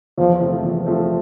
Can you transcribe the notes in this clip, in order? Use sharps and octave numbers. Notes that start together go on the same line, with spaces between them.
E2 F3
C3 F3 A3 C4
E2
C3 F3 A3 C4